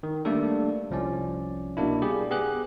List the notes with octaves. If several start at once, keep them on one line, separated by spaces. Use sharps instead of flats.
D#3
G3 A3 A#3 D4 A4
C2 F3 C#4 D5
B2 A#3 D4 E4
G3 G4 G#4
B3 G4 G#4 F#6